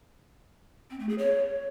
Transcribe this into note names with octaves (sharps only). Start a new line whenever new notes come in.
C4
A3
G#4
C#5